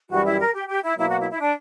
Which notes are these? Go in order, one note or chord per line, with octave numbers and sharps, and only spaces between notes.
F#2 E3 G3 F#4
E4
A#4
G4
G4
E4
B2 F#3 A#3 E4
F#4
E4
E4
D4